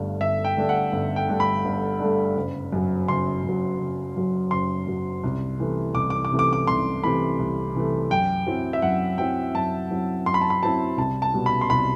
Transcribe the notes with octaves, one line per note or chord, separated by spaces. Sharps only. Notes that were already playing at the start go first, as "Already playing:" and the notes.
Already playing: G1 G2 D3 A3 D4
G1 E5
G5
G2 D3 A3 D4
F#5
G1
G5
G2 D3 A3 D4
B5
G1
G2 D3 A3 D4
F#1
F#2 F#3
F#1 C6
F#2
F#3
F#1
F#2 F#3
F#1 C6
F#2 F#3
C2
C3 E3 A3
C2 D6
D6
D6
C3 E3 A3
D6
D6
C2 C6
C3 E3 A3 B5
C2
C3 E3 A3
F#2 G5
F#3 C4 E4
E5
F#2 F#5
F#3 C4 E4 G5
F#2 A5
F#3 C4 E4
F#2 C6
B5
A5
B5
F#3 C4 E4 A5
C2 A5
A5
B2 G3
B5
C6
C2 B5